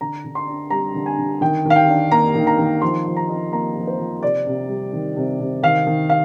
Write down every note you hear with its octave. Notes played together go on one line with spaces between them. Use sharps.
D3 A#5
D3
C6
D4
G3 A#5
D3
G#5
D3
D#3 G5
D#3 F5
G5
D4
A#3 A#5
D#3
A#5
D#3
F3 C6
F3
A#5
D#4
A#3 A#5
F3
C5
F3
C3 D5
C3
G3
D#3
C3
C3
D#3 F5
D#3
F5